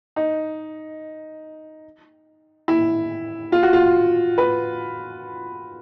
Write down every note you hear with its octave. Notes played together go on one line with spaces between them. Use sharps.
D#4
E4
F4
F#4
F4
B4